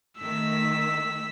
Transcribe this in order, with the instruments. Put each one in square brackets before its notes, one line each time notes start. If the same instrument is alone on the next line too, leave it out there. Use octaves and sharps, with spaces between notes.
[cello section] D#3 A3 [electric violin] E6 B6